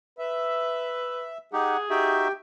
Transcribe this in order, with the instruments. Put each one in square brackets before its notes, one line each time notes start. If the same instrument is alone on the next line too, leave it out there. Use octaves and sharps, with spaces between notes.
[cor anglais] B4 [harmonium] E5
[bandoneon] D#4 G4 [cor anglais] G#4 [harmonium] F#5
[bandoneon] D#4 F#4 E5 [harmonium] G4 G5